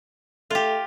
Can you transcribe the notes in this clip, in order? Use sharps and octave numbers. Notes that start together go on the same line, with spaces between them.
A3 F4 G4